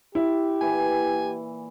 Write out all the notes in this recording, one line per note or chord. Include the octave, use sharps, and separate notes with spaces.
E4 G4
A#2 E3 G#5